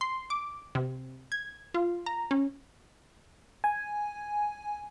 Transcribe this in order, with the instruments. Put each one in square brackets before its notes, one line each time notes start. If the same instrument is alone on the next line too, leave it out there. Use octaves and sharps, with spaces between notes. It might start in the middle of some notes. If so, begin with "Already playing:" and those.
[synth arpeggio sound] C6
D6
C3
G#6
F4
A#5
C#4
[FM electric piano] G#5